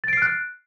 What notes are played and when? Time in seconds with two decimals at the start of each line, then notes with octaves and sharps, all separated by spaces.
0.04 A6
0.08 D7
0.13 C7
0.17 F6
0.22 F#6